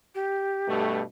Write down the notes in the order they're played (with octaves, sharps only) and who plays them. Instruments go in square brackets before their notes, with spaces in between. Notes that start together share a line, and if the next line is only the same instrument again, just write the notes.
[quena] G4
[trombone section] G2 B2 A3